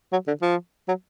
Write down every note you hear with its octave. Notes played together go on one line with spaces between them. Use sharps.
F#3
D3
F3
F#3